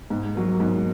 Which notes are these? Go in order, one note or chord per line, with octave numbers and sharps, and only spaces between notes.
G#2
F#3 A#3
G#2